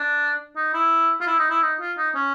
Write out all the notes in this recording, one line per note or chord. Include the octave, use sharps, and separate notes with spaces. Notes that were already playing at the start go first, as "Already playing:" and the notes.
Already playing: D4
D#4
E4
F4
E4
D#4
E4
D#4
F4
D#4
C#4